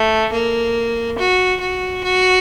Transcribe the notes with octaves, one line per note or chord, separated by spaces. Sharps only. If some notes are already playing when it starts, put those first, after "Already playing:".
Already playing: A3
A#3
F#4
F#4
F#4